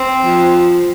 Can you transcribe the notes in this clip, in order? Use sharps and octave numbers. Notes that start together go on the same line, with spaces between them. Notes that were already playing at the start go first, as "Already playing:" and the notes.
Already playing: C4
F3